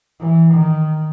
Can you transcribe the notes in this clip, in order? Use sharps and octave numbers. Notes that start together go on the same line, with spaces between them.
E3
D#3